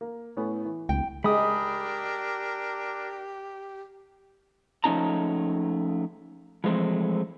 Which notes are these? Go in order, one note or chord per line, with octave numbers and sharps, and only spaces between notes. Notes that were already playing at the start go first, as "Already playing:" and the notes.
A#3
A2 A3 B3 C#4
E3
D1 C#2 G5
G#3 D4 G4 A#4 B5 D#6
F3 A3 C#4 D#4 A5 A#5
E3 F3 G#3 A3 C4